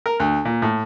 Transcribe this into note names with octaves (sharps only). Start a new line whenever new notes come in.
A#4
D2
A#2
A2